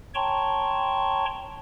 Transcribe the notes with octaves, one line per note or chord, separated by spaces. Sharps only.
C#5 G5 A5 A#5 C6 C#6